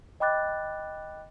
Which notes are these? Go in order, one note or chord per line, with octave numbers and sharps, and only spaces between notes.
D#5 G5 B5 D6 F#6 A6